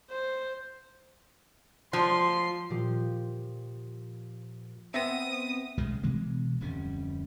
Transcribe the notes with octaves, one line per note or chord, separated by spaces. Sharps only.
C5
F3 C6
A#2 F3 G4
B3 C4 E5 D#6 A#6
B1 C#3 G#3
B2 E3 G#3 A#3
D1 F2 G3 C#4